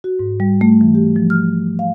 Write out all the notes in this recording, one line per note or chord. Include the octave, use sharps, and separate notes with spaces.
F#4
G#2
G3
A3
E3
G4
F3
F6
F5